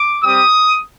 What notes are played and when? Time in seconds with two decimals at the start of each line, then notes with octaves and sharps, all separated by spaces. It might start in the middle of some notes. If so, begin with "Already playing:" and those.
Already playing: D6
0.22 G3 C4 G4 D#6